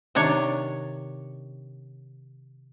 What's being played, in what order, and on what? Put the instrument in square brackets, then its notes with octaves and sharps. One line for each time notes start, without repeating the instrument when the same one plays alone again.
[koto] C3 D#3 D4 C#5